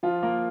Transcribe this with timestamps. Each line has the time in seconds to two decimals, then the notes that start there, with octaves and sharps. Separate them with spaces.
0.03 F3 F4
0.23 A#3 A#4